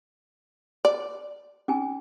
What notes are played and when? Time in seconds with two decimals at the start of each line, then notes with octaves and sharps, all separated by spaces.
0.85 D5
1.68 C#4 D#4 G#5